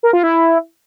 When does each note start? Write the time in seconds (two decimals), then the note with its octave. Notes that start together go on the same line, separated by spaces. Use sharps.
0.03 A#4
0.13 F4
0.23 E4